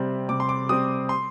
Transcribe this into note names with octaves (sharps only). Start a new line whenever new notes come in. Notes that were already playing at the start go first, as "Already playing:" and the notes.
Already playing: C3 G3 C4
C3 D6
C6
D6
G3 C4 D#6
C6